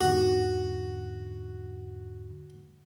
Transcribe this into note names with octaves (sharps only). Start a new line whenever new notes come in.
E2 G#2 D3 F#4